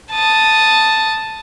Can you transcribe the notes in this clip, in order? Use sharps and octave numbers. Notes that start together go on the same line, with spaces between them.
A5 D#6